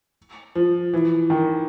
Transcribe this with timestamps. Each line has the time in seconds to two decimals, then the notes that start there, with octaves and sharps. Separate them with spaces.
0.55 F3
0.94 E3
1.30 D#3